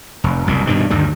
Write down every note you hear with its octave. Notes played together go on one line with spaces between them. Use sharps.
F1
F#1 C2 A#2
G2 B2 D#3
D2 G2 D#3 G3